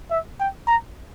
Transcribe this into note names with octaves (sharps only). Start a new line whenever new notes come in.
E5
G5
A#5